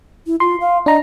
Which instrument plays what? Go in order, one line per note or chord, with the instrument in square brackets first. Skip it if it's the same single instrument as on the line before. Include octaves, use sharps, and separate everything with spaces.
[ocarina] E4
[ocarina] F4 [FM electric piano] C6
[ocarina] F5
[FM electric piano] D4 A#5 [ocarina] D#5